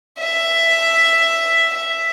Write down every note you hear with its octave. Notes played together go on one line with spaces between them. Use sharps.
E5
E5